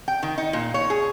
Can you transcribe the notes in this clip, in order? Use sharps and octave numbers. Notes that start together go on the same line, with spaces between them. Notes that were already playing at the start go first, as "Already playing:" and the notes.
G5
D#3
D#4
A#2
C#5
G#4